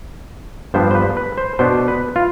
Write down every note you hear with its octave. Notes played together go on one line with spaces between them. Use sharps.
G2 F3 B3 D4 C5
C5
B4
B4
C5
B2 B3 D4 C5
B4
F4